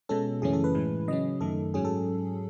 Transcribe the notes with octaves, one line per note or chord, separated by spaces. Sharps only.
B2 G#3 C#4 A4
F#2 C#3 E3 A3 C#4 G#4
A4
B4
A2 E3 G#3
C#3 F#3 C#4 D#5
F#2 D#3 A3 A4
G#2 F#3 C#4 G#4
A4